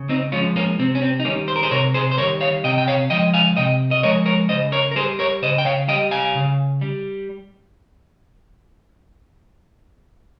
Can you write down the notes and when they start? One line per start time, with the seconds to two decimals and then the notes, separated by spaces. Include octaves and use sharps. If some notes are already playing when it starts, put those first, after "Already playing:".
Already playing: C#3
0.09 C4 D#4
0.32 F3 G#3 C#4 F4
0.56 A#3 C#4
0.79 C3 C4
0.95 C#4
1.02 C4
1.20 D#4
1.25 D#3 G3 A#3 C#4
1.48 C5
1.56 A#4
1.63 G#4 C5
1.71 C3 A#4 C#5
1.94 G#4 C5
2.11 C5
2.18 G3 A#4 C#5
2.21 D#3
2.41 C#5 F5
2.64 C3 D#5 G5
2.78 G5
2.88 C#5 F5
3.10 F3 D#5 G5
3.14 G#3
3.34 F5 G#5
3.57 C3 D#5 G5
3.91 D#5
4.03 F3 G#3 A#4 C#5
4.26 A#4 C#5
4.49 C#3 C5 D#5
4.72 A#4 C#5
4.91 A#4
4.95 G3 G#4 C5
5.19 A#4 C#5
5.42 C#3 C5 D#5
5.58 G5
5.65 C#5 F5
5.88 G3 D#5 G5
6.11 F5 G#5
6.35 C#3
6.81 G3